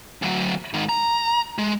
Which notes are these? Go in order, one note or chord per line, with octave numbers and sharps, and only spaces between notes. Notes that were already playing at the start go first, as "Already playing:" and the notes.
D2 F#3
G#2 D#3
A#5
G#3